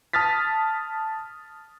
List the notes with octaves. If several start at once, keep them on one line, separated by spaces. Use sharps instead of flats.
A5 D#6 F6 A6 B6